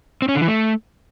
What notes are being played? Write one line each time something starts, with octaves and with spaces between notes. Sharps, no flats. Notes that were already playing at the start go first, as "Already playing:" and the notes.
C4
C#4
D3
E3
A3